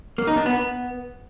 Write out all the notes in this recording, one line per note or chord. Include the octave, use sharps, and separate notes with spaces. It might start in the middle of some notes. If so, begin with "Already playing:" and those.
A#3
D#4
D4
B3